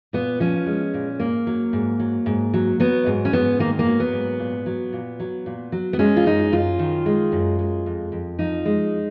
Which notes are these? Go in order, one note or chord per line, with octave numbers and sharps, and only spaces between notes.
A#2 B3
F3 C#4
G#3
A#2
G#2 A#3
F#3
G#2
F#3
G#2
F#3
F#3 B3
G#2
C#4
G#2 B3
D#3 A#3
A#3
F#3
B3
G#2
A#2
F#3
A#2
F#3
A#2
F#3
B3
G#3 C#4
F4
F#2 D#4
F#2 F4
D#3
G#3
F#2
G#3
F2
F2
F3 D#4
G#3